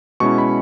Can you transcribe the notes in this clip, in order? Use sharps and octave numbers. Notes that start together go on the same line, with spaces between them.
B2 G#3 C#4 E4 C#6
B5